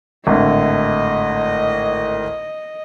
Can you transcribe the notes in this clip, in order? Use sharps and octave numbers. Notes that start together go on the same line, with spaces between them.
G#1 A2 D3 D#5